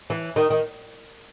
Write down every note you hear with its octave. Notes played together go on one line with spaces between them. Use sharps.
E3
D#3
D#3